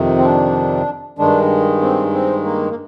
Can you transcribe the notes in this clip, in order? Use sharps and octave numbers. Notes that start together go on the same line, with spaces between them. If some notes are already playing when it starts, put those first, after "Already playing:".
Already playing: F2 C3 D#3
C4
D4
G2 D#3 G#3 D4
C4
C4
A#3
A#3